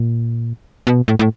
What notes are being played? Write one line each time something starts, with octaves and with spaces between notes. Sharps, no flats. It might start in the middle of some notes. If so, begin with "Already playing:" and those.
Already playing: A#2
B2
A2
A2